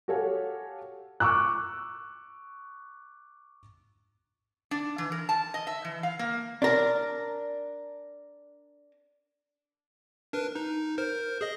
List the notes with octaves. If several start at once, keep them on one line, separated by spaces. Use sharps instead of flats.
F#4 G4 A4 C#5 F5 G#5
C#6 D6 E6 F#6
D4
E3
A#4
A5
D#5
E5
E3
F5
A#3
D4 A#4
D4 A#4 B4
D#4
A#4 C5
G#4 D#5